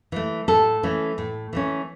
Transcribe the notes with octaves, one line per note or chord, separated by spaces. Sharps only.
E3 A3
A2 A4
E3 A3 C#4
A2
E3 A3 C#4